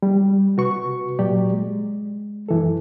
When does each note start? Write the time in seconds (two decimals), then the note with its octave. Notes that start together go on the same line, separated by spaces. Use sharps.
0.02 G3
0.57 C3 F#4 B4 C#6
1.19 A#2 F#3 G4 D5
1.52 G#3
2.49 F#2 E3 A4